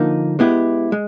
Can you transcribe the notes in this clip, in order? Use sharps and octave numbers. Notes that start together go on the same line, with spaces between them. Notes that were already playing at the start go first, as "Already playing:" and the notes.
Already playing: D3 F3 A#3 D#4
G#3 B3 E4 G4
G#3